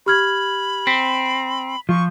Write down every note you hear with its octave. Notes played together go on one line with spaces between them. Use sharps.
G4 B5 F6 G#6
C4 B6
F3 C#6